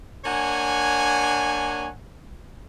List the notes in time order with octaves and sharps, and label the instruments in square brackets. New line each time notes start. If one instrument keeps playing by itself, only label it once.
[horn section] A#3 D4 C#5 F#5 G#5